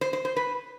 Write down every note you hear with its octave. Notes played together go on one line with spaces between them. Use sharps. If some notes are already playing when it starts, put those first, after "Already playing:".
C5
C5
C5
B4